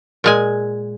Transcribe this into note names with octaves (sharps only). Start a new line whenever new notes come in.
A#2 G#3 G#5